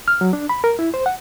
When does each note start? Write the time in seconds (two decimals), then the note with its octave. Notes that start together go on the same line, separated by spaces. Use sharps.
0.08 F6
0.21 F#3
0.33 D4
0.49 B5
0.64 A#4
0.79 E4
0.94 C5
1.06 F#5